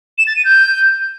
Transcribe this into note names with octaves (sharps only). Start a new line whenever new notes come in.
E7
A6
D#7
G6